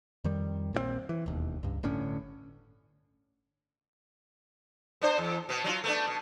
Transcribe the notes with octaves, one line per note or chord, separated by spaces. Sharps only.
F2 D#3 G3
A#1 A#2 D#3 C4
E3
E1 D#2
C#2 G2
G1 A2 D3 C#4
B3 D4 C5
E2
B2 B3
F#3 D4 F4
A3 B3 D4
B2